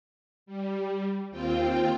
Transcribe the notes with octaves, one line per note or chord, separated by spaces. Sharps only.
G3
D#2 C4 F4 G5